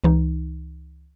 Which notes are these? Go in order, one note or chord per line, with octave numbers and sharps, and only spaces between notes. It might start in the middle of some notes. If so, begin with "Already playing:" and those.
C#2 E3 D#4